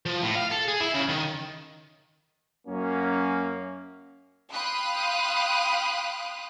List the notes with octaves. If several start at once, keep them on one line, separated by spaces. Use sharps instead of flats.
F3
A2
F5
A4
G#4
E4
C#3
D#3
F#2 F#3 A#3 C#4
F5 G5 B5 C6 D#6 F#6